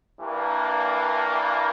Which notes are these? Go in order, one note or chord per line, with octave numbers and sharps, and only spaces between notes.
G2 E3 G3 A#3 D4